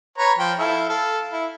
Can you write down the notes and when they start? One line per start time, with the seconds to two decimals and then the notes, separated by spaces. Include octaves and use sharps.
0.18 B4 C#5 A#5
0.39 F3 G5
0.59 E4 A4 F5
0.89 A4 F5
1.31 E4